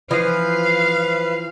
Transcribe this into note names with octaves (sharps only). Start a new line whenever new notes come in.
E3 F3 B4 D#5 F5